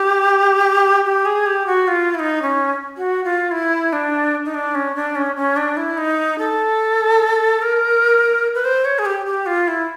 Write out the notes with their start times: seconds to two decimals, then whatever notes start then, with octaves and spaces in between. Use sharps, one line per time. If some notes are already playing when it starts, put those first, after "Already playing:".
Already playing: G4
1.05 G4
1.25 G#4
1.46 G4
1.67 F#4
1.88 F4
2.14 E4
2.19 D#4
2.42 C#4
2.97 F#4
3.24 F4
3.52 E4
3.93 D4
4.45 D#4
4.54 D4
4.75 C#4
4.95 D4
5.15 C#4
5.36 C#4
5.57 D4
5.77 E4
5.98 D#4
6.38 A4
7.62 A#4
8.55 B4
8.65 C5
8.85 C#5
8.99 G#4
9.05 G4
9.26 G4
9.46 F4
9.68 E4